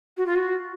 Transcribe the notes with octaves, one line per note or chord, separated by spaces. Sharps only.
F#4
F4
F#4